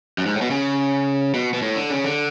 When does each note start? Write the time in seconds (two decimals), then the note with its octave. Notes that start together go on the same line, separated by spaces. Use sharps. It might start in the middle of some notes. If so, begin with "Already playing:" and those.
0.18 F#2
0.26 G#2
0.34 A2
0.41 B2
0.51 C#3
1.34 B2
1.54 B2
1.62 A2
1.76 D3
1.90 C#3
2.05 D3